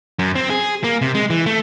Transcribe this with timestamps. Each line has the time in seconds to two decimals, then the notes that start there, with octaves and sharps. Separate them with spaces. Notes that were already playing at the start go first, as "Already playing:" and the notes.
0.19 F#2
0.35 C4
0.50 G#4
0.84 A#3
1.02 C3
1.15 G#3
1.30 E3
1.46 A3